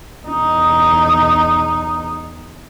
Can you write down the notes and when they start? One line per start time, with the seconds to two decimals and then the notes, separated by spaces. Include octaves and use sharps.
0.23 E2 D#4